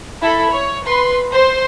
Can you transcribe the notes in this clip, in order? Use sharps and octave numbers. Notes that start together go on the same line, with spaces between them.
E4 A4 B5
C#5
B4 C6
C5 C6